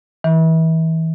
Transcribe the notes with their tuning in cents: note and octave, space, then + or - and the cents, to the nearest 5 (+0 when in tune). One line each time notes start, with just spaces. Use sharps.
E3 -30